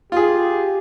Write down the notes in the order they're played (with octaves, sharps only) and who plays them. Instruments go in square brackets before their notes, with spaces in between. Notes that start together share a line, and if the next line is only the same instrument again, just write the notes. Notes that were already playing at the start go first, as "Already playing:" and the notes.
[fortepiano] F4 G#4 [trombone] G4